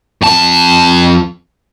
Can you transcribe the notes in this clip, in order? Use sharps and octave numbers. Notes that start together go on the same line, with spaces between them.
F2 A5